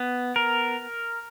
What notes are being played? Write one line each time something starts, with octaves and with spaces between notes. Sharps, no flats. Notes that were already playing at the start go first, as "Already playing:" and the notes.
Already playing: B3
A#4